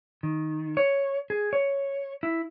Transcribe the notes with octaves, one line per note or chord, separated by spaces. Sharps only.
D#3
C#5
G#4
C#5
E4